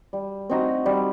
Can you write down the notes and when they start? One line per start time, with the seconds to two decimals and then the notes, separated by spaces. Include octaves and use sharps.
0.13 G3
0.50 C4 D#4 F#4
0.86 G3